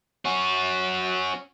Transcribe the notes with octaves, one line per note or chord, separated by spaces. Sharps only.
C#4 F#4